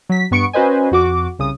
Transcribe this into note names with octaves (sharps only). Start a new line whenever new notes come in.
F#3 B6
G2 B3 C#6 C#7 D7
C#4 F#4 B4 C5 D#5 G#5
F2 F#4 D6
C2 C#3 D#6